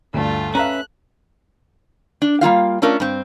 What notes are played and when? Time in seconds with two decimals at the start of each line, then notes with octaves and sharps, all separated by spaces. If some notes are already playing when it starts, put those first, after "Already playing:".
0.14 D2 G2 A3 F4
0.55 C#4 B4 E5 F5 A#5 F#6
2.22 D4
2.41 G3 A#3 F4 F5
2.82 A3 C#4 D4 F4 A#4
3.00 G2 C4